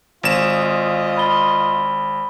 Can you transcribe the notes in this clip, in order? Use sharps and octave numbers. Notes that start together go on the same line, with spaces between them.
G#1 F4 D#5 E7
B5 A6 G7